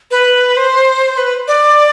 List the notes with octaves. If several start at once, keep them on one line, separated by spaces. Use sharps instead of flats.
B4
C5
B4
D5